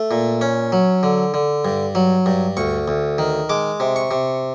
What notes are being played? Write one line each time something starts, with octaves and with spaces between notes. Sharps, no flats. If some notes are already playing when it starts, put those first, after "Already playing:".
Already playing: A3
A#2
C#4
F#3
D3
D3
G2
F#3
G2
D2 C#6
D2
D#3
G#3 D6
C3
C#6
C3